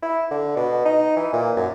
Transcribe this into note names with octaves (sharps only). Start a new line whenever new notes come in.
E4
D3
B2
D#4
E3
A#2
F#2